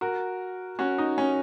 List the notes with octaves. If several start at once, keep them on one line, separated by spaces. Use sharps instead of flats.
F#4 A#4
C#4 F#4
D#4
C#4